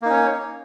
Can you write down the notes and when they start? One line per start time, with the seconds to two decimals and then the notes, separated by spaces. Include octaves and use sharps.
0.02 A#3
0.06 D#4
0.09 C#4
0.13 C#5